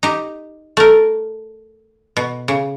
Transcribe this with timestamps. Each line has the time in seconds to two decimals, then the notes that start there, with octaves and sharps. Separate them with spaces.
0.03 D#4 G4
0.77 A3 A#4
2.17 B2
2.48 C#3